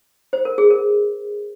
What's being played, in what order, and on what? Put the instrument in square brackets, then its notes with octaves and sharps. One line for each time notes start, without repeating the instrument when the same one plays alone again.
[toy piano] C5
A#4
G#4
A#4